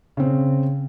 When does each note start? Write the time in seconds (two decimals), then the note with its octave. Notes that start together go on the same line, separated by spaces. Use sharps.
0.17 C#3 C4